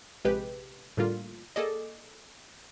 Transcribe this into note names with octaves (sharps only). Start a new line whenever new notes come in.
A#1 C3 G#3 G4 B4
A2 D3 G3 A#3 F4
A#3 G#4 A4 D5 D#5